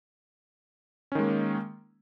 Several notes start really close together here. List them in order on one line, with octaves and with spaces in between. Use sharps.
C#4 D#3 G#3 A#3